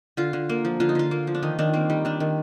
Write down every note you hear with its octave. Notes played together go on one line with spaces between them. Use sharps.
D3 F4
D3
A#3
F3
D3 F4
D#4
D3 F4
A#3
F3
D4
D#3 D#4
D#3 D4
A#3 C4
G3 D#4
D#3 D4
D#3